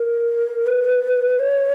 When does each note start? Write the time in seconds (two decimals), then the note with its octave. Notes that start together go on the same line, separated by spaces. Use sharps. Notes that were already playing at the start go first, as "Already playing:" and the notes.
Already playing: A#4
0.67 B4
1.39 C#5